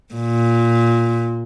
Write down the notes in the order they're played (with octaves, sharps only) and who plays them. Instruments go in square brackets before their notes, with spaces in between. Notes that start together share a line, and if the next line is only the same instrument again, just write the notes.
[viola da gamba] A#2